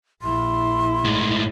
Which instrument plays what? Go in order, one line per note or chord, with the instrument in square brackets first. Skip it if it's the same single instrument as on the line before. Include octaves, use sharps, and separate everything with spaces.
[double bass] A#1 E4 [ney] C6
[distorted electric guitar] A2 G#3